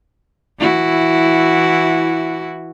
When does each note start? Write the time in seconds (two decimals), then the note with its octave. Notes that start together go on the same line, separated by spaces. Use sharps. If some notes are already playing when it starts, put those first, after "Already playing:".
0.59 E3 E4 F#4